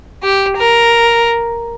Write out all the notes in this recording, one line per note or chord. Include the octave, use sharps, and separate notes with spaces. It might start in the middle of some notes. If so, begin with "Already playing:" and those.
G4
A#4